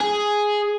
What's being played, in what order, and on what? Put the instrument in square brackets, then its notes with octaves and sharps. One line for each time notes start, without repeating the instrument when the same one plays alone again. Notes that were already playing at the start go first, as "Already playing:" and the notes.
[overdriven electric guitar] G#4